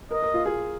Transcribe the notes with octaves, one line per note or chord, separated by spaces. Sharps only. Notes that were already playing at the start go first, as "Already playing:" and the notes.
A#4 D#5
A#4
F4
G#4